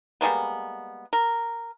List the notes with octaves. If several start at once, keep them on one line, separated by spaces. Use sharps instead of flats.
G3 G#3 A#3 B3
A#4